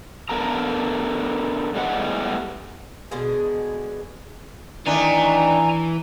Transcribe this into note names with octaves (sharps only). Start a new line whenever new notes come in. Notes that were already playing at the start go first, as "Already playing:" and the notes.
D3 B3 A4 A#4 A#5
A2 G3 G#3 B3 F#5
B2 D3 G#3 G#4
D#3 E3 A3 D4 G#5 A#5